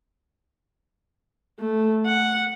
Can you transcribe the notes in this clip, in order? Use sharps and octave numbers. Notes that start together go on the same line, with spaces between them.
A3
F#5